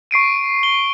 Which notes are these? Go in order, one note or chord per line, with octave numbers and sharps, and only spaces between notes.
C#6 C7 D7 D#7
G7